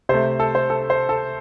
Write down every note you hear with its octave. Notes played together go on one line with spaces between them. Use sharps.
C3 A3 C5
A4
C5
A4
C5
A4